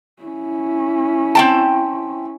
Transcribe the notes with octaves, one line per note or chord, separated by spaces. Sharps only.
C#4 E4
C4 G5 A5